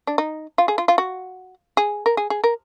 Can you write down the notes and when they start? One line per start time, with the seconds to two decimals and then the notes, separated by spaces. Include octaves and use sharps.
0.07 D4
0.18 D#4
0.58 F4
0.68 G#4
0.78 F4
0.88 F4
0.98 F#4
1.77 G#4
2.06 A#4
2.17 G#4
2.30 G#4
2.44 A#4